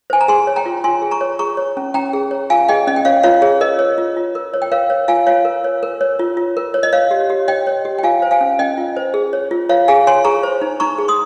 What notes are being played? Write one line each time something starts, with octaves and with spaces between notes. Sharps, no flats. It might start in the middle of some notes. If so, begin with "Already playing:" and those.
C5 G#5
A#5
G#4 G#5 C6
C#5
G5 A#5
F4
F4 G#5 C6
G#4
A#5 C#6
C#5
G#4 A#5 C#6
C#5
C#4
C#4 G5 A#5
G#4
C#5
F4 F5 G#5
G#4 D#5 G5
C#4 D#5
G5
C#4 C#5 F5
F4 C#5 F5
G#4 C#5
A#4 D#5
C#5
F4
F4
A#4
C#5
G5
A#4 C#5 F5
C#5
F4 F5 G#5
F4 C#5 F5
A#4
C#5
A#4
C#5
F4
F4
A#4
C#5
D#5
C#5 F5
G4
G4
C#5 D#5 G5
C#5
G4
G5
F4 F5 G#5
C5
F5 G#5
C#4
C#4 D#5 G5
F4
C5
G#4
C#5
F4
F4 C#5 F5
G#4 F5 G#5
C#5 G#5 C6
G#4 A#5 C#6
C5
D#4
D#4 A#5 C#6
G#4
C6 D#6